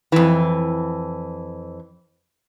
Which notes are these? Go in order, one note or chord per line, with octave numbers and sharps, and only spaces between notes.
F2 E3